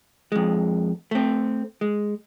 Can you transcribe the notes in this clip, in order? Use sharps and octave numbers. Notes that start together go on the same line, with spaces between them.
F2 G#3
A3 C4
G#3